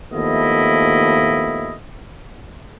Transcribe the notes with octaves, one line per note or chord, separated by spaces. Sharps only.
D#2 F3 A3 B3 E4 D#5